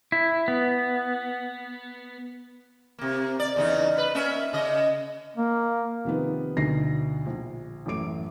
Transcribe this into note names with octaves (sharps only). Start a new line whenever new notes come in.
E4
B3
C3 A#3
D5
E2 C#3 D#4
B4
A#3 C#4 E5
C#3 D#5
A#3
C3 D#3 F3 B3
D2 B2 D3 D#4 A#6 C7
A#1
A1 F#2 A3 D6 D7